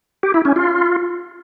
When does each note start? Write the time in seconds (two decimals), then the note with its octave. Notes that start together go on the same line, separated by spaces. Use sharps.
0.23 G4
0.34 E4
0.45 C#4
0.56 F4